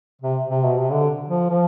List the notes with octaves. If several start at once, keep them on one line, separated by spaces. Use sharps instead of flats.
C3
C3
B2
C3
D3
F3
F3